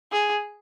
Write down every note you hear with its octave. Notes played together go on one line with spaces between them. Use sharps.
G#4